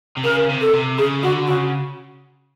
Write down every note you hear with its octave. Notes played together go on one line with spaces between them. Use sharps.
C3
C#3 A#4
C3
A4
C3
C#3 G#4
D3 F#4
C#3 F#4